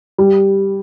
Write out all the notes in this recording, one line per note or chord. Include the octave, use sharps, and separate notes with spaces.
G3